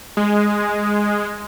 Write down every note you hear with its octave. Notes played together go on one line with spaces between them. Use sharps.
G#3